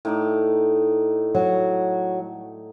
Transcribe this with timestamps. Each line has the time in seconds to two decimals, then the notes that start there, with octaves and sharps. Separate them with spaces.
0.05 A2 D#4 D5
1.35 F#3